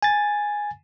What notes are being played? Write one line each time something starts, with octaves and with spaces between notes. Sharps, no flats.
G#5 A6